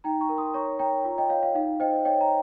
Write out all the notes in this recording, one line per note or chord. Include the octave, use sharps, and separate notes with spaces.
D#4 G5 A#5
A#5 C#6
A#4
C6 D#6
C#5 A#5 C#6
C#5 G5 A#5
F4
D#5 G5
C#5 F5
F5
D#4 F5
C5 D#5 G5
C#5 D#5 G5
A#5